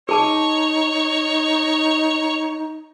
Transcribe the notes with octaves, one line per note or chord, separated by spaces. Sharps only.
D#4 G#4 C#5 A5 D6